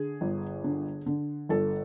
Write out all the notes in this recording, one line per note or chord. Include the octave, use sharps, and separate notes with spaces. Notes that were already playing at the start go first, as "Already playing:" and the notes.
Already playing: D3 G#4
G1
D3
D3
G1 A4